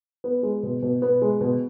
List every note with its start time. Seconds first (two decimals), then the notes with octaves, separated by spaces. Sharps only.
0.24 B3
0.43 G#3
0.63 B2
0.83 B2
1.02 B3
1.22 G#3
1.41 B2